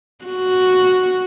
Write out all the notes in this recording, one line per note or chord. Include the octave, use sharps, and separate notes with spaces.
F#4